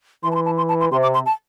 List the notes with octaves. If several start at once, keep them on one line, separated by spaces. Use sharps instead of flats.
E3 C6
A5
C6
A5
C6
A5
C6
C3 C6
D6
C6
A5